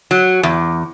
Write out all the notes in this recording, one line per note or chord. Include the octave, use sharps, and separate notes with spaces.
F#3
E2